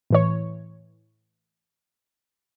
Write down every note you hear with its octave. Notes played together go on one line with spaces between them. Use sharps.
A2 E3 C#5